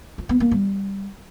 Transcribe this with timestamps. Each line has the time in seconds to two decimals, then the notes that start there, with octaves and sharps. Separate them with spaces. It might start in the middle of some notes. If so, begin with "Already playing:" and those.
0.18 F4
0.29 B3
0.40 A#3
0.51 G3